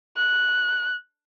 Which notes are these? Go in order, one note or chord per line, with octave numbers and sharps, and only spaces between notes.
F#6